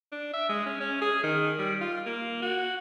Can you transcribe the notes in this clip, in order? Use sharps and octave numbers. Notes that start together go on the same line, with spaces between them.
D4
E5
G#3
C#4
C#4
G#4
D#3
G3
F4
A#3
F#4